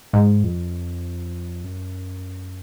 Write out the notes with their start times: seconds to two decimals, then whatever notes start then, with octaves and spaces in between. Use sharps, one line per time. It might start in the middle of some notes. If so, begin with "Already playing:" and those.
0.13 G#2
0.44 F2
1.64 F#2